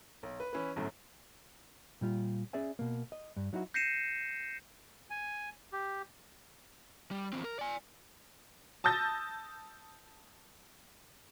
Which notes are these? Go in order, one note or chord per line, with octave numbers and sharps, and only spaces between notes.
B1
B4
E3 C#4 E4 B4
G1 F#2 A2
A#2 G3 F4
C#4 G#4 D5 E5 G#5
B2 A#3
D#5
G2
F#3 D#4 E4 F#4
G6 A#6 C7 C#7 D#7 E7
G#5
G4
G3
E2 C4
A#4
D5 G#5
A5 D#6 E6 G6 A6 A#6